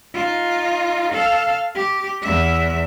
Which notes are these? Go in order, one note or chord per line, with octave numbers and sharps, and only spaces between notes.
D#4 F4
A4 F5
G4
E2 E5